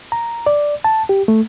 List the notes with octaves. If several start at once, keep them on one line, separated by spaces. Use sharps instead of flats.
A#5
D5
A5
G4
A3